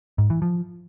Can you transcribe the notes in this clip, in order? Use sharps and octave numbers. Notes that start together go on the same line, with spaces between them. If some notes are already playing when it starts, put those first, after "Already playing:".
G#2
E3
F3